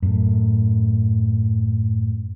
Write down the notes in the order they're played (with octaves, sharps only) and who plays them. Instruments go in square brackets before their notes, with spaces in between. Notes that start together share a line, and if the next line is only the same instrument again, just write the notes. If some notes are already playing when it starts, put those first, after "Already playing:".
[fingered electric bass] F#2 A2